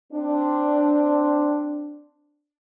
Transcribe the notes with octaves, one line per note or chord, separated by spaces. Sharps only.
C4 D4